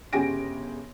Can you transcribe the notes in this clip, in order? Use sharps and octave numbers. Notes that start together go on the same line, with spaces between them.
G1 C#3 G4 G#5 A#6 D7